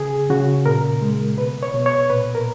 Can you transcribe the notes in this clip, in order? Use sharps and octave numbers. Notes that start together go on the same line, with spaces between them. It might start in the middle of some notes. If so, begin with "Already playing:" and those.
Already playing: C#3 G#4
C#3 F#4
A#2 A#4
G#3
B2 B4
C#5
B2
C#5
A#2 B4
A#4